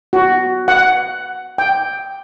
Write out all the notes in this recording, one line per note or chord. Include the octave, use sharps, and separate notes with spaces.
F#4
F#5
G5